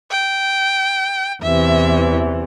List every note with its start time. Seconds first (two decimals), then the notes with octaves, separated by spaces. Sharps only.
0.11 G5
1.42 E2 C3 E3 E5